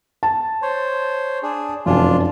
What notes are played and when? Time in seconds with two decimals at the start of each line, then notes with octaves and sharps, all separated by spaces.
0.23 A5
0.62 C5 C#5
1.43 D4 G#4
1.86 F1 F#2 D4 F4 G#5